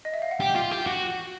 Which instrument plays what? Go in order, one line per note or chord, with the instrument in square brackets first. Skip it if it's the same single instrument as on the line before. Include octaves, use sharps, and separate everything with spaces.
[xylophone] D#5
E5
F5
F#5
[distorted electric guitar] G4 [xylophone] G5
[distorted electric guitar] F4
G4
F#4